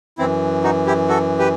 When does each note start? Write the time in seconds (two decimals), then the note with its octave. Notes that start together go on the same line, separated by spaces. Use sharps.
0.18 F#2 E3 C4 E4
0.64 D#4 F#4
0.87 E4 G4
1.08 F#4 A4
1.39 G4 B4